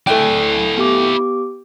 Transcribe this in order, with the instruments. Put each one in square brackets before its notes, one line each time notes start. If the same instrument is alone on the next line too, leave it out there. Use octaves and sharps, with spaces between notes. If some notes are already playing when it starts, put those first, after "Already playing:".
[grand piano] A3 G5 [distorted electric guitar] E4 D5
[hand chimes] B3 G4 D6